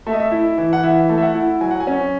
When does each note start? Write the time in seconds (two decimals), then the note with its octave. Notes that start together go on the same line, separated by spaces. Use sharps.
0.07 A3 E5
0.13 D#5
0.20 E5
0.32 E4
0.58 E3
0.73 F#5
0.83 E3 E5
1.09 A3
1.18 E5
1.22 F#5
1.35 E4
1.61 F#3 G#5
1.71 F#5
1.80 G#5
1.87 C#4